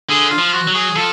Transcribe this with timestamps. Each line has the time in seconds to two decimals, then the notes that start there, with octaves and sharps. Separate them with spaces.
0.09 D3 G#4
0.31 F4
0.38 F3
0.53 F#4
0.68 F#3
0.75 G#4
0.96 F3 A4